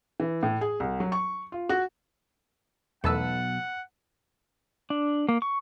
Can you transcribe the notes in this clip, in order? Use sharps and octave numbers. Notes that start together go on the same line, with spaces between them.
E3
A2
G#4
C2
F#3
C#6
F4
F#4
B1 E2 A3 B4 F#5 A5 E6
D4
A#3
C#6